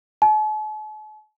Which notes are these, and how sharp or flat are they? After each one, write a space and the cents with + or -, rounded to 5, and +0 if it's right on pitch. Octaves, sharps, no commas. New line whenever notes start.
A5 -45